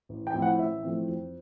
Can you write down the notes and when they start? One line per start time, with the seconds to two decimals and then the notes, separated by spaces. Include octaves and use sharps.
0.09 A1
0.27 G5
0.34 A2 F3 A3 C4
0.42 F#5
0.58 A1 E5
0.83 A2 F3 A3 C4
1.08 F2